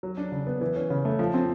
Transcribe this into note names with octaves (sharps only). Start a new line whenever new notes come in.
F#3
D4
C#3
B3
E3
C#4
C#3
A3
F3
C4